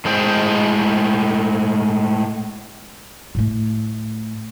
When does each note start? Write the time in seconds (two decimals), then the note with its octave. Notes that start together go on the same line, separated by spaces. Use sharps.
0.05 A2 G#3 G#4 C5 G5
3.35 A2 A3